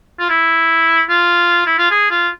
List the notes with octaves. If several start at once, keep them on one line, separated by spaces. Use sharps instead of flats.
F4
E4
F4
E4
F4
G#4
F4